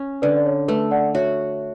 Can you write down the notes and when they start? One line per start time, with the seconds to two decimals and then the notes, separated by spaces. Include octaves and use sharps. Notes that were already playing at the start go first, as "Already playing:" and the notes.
Already playing: C#4
0.22 D3 B4 D5
0.37 D5
0.46 C#5
0.68 A3 B4
0.91 D5 F#5
1.14 F#4 C#5 E5